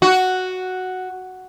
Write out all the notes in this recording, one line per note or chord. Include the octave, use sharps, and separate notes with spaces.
F#4